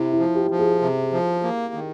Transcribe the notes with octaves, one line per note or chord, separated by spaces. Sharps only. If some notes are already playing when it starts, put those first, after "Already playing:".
Already playing: C3 E4
E4
F3
G4
F3
G#4
C3
F3
A#3
D#3